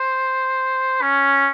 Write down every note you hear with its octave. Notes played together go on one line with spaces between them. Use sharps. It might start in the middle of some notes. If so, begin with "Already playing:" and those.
Already playing: C5
C#4